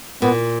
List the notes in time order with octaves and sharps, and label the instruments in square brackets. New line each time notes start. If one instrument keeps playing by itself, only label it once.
[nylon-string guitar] A#2 [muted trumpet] B3